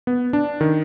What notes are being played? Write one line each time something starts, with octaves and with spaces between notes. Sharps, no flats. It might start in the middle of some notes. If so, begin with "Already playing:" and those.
B3
D4
D#3